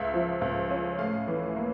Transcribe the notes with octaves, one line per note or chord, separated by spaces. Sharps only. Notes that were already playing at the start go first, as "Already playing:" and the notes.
Already playing: C#2 E5
F3
C#2
C#4
A2 F5
E3
A#3